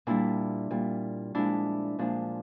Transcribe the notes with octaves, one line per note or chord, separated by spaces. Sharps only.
A#2 G3 D4 E4
A#2 G3
A#2 F3 G#3 D4 E4
A#2 F3 G#3 D4